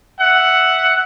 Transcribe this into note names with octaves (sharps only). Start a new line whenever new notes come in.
E5 F#5